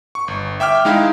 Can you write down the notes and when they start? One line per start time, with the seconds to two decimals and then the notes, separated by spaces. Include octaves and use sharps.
0.15 C#6
0.28 G1
0.60 E5 G5 D6 F6
0.85 G#3 D#4 E4 F5